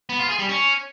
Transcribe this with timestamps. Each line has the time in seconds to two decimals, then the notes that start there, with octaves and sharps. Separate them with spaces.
0.09 B3
0.19 F4
0.29 G#4
0.39 G3
0.49 C#4